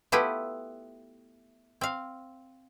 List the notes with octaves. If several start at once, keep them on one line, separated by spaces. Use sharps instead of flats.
A3 B3 E4 F4 G4 B4
C4 F5